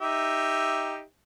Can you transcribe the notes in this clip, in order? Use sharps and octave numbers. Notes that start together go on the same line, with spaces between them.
D#4 G4 E5